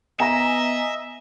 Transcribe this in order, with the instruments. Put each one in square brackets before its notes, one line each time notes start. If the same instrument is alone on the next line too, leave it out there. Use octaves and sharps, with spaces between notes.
[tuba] B3 [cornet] D#5 [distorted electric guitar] E5 [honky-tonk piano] G#5 A#5 A#6